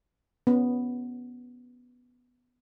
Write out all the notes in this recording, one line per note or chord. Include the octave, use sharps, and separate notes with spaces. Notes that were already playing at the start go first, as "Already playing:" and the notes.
B3 C#4